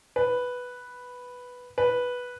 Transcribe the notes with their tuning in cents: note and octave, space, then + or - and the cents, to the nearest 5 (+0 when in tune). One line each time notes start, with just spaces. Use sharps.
B4 +0
B4 -5